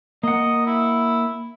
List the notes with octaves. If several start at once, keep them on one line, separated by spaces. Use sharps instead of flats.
A#3 D#5 F#5
E4